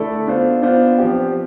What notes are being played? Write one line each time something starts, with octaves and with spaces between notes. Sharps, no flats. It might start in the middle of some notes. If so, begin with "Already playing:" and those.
Already playing: D3 A3 E4 A4 D5
B3 D4 F4 C5
B3 D4 F4 C5
F3 C4 G4